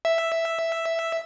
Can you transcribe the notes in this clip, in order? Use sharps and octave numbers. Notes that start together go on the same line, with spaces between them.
E5